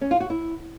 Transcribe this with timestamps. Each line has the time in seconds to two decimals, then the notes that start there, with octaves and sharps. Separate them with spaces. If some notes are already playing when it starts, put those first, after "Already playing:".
0.01 C#4
0.11 F4
0.20 F#4
0.30 E4